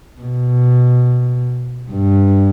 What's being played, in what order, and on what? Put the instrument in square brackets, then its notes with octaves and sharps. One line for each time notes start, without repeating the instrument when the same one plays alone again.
[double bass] B2
G2